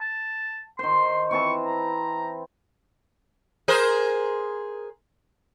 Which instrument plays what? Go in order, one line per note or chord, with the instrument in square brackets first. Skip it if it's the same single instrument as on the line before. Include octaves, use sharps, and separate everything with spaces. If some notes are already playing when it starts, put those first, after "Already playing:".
[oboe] A5
[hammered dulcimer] D#3 C5 [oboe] C6
[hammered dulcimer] E3 C4 A5 [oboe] C#6
[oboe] A#5
[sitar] G#4 A#4 C5